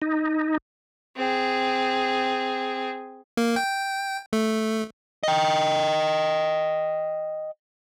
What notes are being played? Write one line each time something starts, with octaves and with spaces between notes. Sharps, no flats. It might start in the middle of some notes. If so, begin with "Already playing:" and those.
D#4
C4 G#4
A#3
G5
A3
D#5 G5